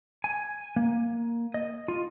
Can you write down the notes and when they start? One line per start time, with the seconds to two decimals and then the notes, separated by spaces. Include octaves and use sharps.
0.24 G#5
0.76 A#3
1.54 D#5
1.88 F4